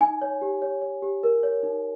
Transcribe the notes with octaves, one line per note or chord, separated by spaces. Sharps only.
D#4 G#5
C#5
G4
C#5
C#5
G4
A#4
C#5
D#4